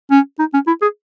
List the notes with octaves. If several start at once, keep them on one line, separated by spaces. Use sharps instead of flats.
C#4
D#4
C#4
E4
G#4